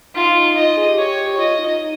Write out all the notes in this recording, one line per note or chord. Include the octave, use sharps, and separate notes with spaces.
D#4 F4
F4 D#5
G#4
G4
C#5
F4 D#5
D#4